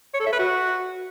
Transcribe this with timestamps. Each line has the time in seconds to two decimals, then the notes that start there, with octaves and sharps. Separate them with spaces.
0.14 C#5
0.20 A4
0.26 E5
0.33 B4
0.39 F#4